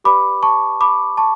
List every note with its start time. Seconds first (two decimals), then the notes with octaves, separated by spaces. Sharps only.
0.04 G4 B4 D5 B5 D6
0.43 A5 C#6
0.81 B5 D6
1.17 A5 C#6